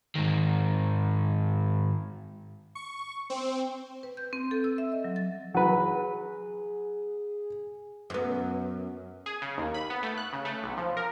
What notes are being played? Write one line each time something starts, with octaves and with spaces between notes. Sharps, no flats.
G#2 D#3
C#6
C4
B4
G6
C4
A4
E6
E5
D#5
F#3
A6
F#3 G#4 B4
F#2 B3
G#4
C#3
D#2
B5
B3
A3
F#6
C#3
A3
B1
F3
A#4